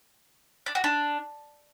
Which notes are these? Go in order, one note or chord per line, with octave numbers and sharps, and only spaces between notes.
D4
F#4
D4